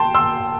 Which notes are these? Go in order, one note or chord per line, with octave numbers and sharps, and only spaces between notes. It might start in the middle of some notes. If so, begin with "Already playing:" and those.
Already playing: G5 A5 C6
C6 E6